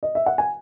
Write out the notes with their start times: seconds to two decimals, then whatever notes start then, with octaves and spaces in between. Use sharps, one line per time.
0.03 D#5
0.15 E5
0.26 F#5
0.38 G#5